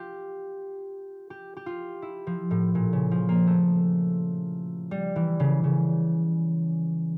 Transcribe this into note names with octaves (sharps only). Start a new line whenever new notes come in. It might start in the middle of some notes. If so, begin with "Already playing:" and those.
Already playing: F4 G4
G4
G4
F4
E4
F3
A2
A#2
C#3
F3
A#3
A3
G3
E3
C#3
C#3